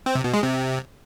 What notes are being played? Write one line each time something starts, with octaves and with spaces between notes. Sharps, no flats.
C4
C3
B2
G#3
C3